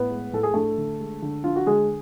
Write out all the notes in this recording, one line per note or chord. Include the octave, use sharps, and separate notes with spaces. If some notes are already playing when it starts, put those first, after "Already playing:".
Already playing: A2 B3 B4
G#3
A2 A4
G#4
A3 D4 A4
D3
G#3
D3
D4 F4
F#4
D3 G#3 G#4